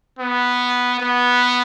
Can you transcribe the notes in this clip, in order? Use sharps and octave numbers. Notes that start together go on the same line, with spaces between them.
B3
B3